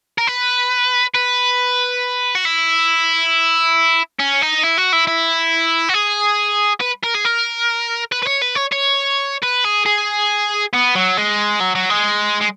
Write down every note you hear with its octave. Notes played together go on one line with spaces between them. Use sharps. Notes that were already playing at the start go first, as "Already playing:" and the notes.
A#4
B4
B4
F#4
E4
C#4
D#4
E4
F#4
E4
E4
F#4
G#4
B4
A#4
G#4
A#4
B4
B4
C#5
B4
C#5
C#5
B4
G#4
G#4
B3
F#3
G#3
F#3
F#3
G#3
G#3